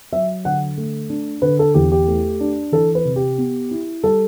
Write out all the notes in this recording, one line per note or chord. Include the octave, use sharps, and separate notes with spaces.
F#3 E5
D3 F#5
A3
D4
D3 B4
A4
E2 G4
G4
A3
D4
E3 A4
B4
C3
G4
B3
E4
G3 A4